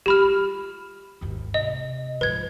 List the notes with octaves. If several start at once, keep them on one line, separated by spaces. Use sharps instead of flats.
G3 F4 G4 B5 F6
G#1 D#2
C3 D#5
G#2 F3 B4 G#6